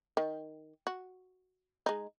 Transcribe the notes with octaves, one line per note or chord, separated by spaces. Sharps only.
D#3
F#4
G#3 D#4